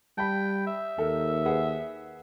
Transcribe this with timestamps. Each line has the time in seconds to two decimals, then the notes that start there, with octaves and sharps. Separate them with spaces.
0.18 G3 G5 A5 B5
0.67 E5
0.98 D#2 A4 A#4
1.45 G#4 B4 F#5